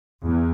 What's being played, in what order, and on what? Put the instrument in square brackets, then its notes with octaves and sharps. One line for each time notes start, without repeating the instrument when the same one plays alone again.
[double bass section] E2